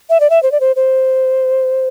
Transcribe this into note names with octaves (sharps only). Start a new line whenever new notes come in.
E5
D5
E5
C5
D5
C5
C5